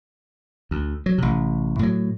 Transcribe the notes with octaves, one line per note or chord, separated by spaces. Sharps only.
D2
F#3
A1 C3
A2 F#3